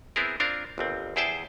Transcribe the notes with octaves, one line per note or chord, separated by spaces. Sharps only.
B3 C4 E4 G#4 A#4
C4 D4 F4 A#4
G1 D#2 C4
E2 E4 G#4 C5 G5 A5